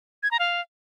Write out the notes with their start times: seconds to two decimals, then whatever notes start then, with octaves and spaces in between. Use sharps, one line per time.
0.23 G#6
0.31 A#5
0.39 F5